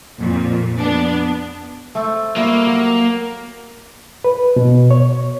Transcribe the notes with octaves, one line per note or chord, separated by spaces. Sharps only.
F2 A#2
B3 D4
A3 C4 A4
G3 A3 A#3 F4
F#3
B4
B2
C#5